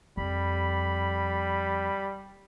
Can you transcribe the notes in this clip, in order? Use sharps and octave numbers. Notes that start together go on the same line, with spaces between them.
F2 G3 B5